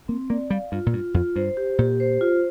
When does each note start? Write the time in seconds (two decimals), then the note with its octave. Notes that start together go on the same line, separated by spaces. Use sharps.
0.08 A#3 C4
0.30 A#3 D5
0.50 G3 F5
0.72 G2 F4
0.86 A#2
0.93 G2 F4
1.14 F2 F4
1.36 G2 C5
1.57 G4
1.78 A#2 G4
2.00 C5
2.21 F4